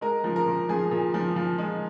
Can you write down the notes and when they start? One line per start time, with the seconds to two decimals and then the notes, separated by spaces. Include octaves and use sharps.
0.01 G#3 A#4
0.24 F3
0.36 A#4
0.47 A#2
0.69 F3 G#4
0.91 A#2
1.14 F3
1.36 F3
1.58 G#3